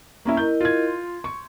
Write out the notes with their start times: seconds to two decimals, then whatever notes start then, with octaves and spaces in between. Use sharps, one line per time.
0.25 A#3 C#4 E4 A#5 C#6
0.37 E4 A#4 D#5 G6
0.61 F4 G#6
0.86 C6
1.24 C#6